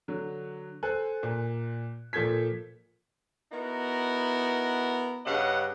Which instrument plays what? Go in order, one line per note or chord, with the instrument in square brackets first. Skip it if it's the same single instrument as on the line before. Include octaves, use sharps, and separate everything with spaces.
[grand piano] D3 F#3
A4 C5 G#5 F#6
A#2
A#2 F3 A4 G6 G#6 B6
[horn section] B3 D#4 E4 F#4 A#4
G2 C#3 D#5 F#5